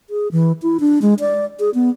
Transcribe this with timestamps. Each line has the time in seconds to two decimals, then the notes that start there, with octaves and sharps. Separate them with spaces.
0.10 G#4
0.32 E3
0.62 E4
0.80 D4
1.02 G#3
1.20 D5
1.60 G#4
1.74 B3